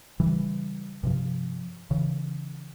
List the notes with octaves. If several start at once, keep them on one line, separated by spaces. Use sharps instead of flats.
C#3 E3 G3
G2 C3 F3
C#3 E3